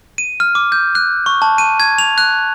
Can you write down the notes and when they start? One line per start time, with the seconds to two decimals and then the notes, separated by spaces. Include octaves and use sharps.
0.18 D#7
0.40 F6
0.55 D6
0.72 G6
0.95 F#6
1.26 C#6
1.42 A5
1.58 D#7
1.80 G#6
1.98 F7
2.18 F#6